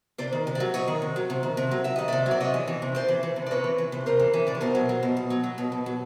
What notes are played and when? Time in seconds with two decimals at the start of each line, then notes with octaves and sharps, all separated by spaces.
0.18 C3 C5 D5
0.32 D#3
0.47 C3
0.55 D5 E5
0.60 F#3
0.74 C3 C#5 D#5
0.88 D#3
1.02 C3
1.16 F#3
1.30 C3
1.43 D#3
1.57 C3
1.71 F#3
1.84 C3 E5
1.96 D#3 D#5
2.08 C3 D5 E5
2.26 F#3
2.31 D5
2.40 C3 C#5 D#5
2.54 E3
2.68 E3
2.82 C3
2.95 C3 C5 D5
3.08 E3
3.23 E3
3.36 C3
3.46 D5
3.51 C3 B4 C#5
3.64 E3
3.78 E3
3.92 C3
4.06 C3 A#4 C5
4.19 E3
4.34 E3
4.47 C3 D5
4.55 C#5
4.61 B2 A#4 C5
4.75 F#3
4.89 F#3
5.03 B2
5.17 B2
5.30 F#3
5.44 F#3
5.58 B2
5.72 B2
5.86 F#3